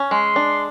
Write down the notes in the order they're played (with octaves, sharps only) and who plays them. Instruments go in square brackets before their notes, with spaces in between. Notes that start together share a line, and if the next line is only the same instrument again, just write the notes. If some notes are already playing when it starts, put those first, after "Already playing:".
Already playing: [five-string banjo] C#4
[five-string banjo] G#3 [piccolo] C6
[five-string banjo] D4